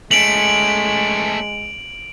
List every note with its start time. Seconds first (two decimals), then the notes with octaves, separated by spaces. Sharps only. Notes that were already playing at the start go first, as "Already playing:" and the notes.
0.11 G#3 A3 C#4 D7 F7 F#7